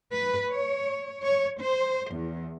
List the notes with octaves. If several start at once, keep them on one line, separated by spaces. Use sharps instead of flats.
B4
C#5
C#5
C5
E2